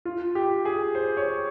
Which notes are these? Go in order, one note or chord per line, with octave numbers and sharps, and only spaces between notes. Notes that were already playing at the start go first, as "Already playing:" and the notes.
F4
G4
G#4
C5
C#5